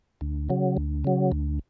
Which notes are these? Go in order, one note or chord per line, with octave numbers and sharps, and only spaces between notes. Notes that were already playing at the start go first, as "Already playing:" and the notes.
D2
C#3 F#3
D2
C#3 F#3
D2